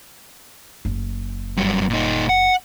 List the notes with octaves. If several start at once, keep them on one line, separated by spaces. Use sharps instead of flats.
F#1
G2 F#3
A#2 D#4
F#5